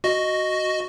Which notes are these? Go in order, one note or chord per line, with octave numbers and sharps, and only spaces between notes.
F#4 D#5